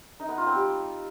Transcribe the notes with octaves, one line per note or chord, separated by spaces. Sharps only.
D#4
B3
F4
C4
G3